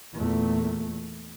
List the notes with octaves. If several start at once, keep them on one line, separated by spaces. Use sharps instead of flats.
E2 A#2 A3